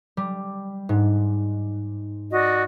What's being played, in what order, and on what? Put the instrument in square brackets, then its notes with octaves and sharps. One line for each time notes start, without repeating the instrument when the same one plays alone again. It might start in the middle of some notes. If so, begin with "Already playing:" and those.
[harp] G3
G#2
[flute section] F#4 D5 D#5